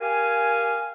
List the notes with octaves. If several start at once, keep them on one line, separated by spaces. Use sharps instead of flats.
G4 A#4 F5 G#5